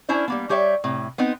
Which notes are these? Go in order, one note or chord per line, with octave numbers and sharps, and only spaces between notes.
C#4 D4 E4 C5 D5
G3 A#3 B3
G3 G4 C#5 D5 E5
A2 C3
B3 C4 D#4